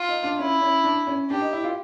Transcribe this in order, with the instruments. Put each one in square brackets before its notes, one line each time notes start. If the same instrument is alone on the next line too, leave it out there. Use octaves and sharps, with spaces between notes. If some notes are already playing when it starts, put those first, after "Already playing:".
Already playing: [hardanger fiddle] F4
[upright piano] D#4
D4
[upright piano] C#4 [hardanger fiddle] E4
[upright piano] C#4
D4
C#4
[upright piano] D4 [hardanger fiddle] G4
[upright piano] D#4
E4
F4